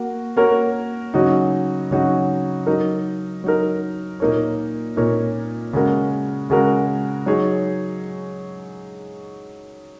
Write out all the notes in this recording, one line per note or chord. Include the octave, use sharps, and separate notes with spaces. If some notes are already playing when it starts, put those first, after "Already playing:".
Already playing: A#3 F#4
A#3 F#4 A#4 C#5
C#3 F#3 D#4 F#4
C#3 F#3 D#4 F#4
F#3 D#4 A#4
F#3 D#4 A#4
A#2 A#3 D#4 A#4 C#5
A#2 A#3 D#4 A#4 C#5
C#3 G#3 F#4 A#4
C#3 G#3 F#4 A#4
F#3 D#4 G#4 C#5